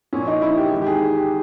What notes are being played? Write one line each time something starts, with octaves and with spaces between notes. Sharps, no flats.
A#1 A#2 C#4
D#4
E4
G4
G#1 G#2 E3
G4
G#4
G4